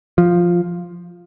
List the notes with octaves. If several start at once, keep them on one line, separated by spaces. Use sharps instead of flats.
F3